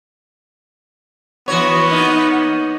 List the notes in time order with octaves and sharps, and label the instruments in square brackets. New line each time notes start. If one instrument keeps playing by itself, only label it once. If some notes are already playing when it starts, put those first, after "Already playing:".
[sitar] E3 F#4 C#5 [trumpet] B3
[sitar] A#3 D#4